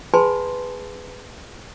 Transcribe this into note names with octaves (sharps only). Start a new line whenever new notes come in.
G#4 B4 G#5 A5 B5 C6